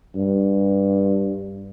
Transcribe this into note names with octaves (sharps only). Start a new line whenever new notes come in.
G2